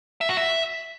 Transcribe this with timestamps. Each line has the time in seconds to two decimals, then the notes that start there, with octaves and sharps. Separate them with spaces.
0.21 E5
0.29 F#4
0.37 E5